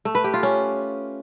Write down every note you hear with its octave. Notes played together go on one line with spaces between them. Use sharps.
A3
B4
G4
F4
C#4